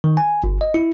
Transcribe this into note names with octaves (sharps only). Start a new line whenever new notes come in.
D#3
G#5
G1
D#5
E4